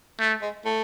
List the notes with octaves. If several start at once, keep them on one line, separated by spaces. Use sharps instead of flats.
A3
G#3
A3